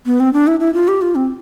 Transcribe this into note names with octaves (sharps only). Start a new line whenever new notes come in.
B3
C4
D4
E4
E4
F4
G4
F4
C4